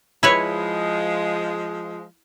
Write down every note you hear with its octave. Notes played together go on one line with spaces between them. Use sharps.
F3 G#3 E4 B4 C#5